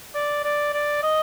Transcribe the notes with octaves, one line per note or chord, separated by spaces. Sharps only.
D5
D5
D5
D#5